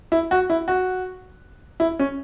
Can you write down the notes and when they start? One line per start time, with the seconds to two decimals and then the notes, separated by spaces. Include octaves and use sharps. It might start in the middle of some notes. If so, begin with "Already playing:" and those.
0.12 E4
0.31 F#4
0.50 E4
0.68 F#4
1.80 E4
1.99 C#4